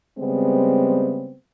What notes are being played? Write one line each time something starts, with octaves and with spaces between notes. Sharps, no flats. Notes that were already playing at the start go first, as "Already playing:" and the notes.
C#3 G3 G#3 B3 C4